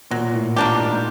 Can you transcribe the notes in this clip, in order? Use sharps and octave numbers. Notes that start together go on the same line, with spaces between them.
A#2 F#3
A2
A#2 A#3 D4 G4
G#2